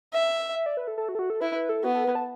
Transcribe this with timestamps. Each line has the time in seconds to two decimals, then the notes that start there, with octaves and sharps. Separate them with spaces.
0.13 E5
0.55 E5
0.66 D5
0.77 B4
0.87 A4
0.98 A4
1.09 F#4
1.15 A4
1.19 F#4
1.30 A4
1.41 E4 B4
1.55 B4
1.69 A4
1.84 B3 F#4
1.95 A4
2.05 B4
2.15 A5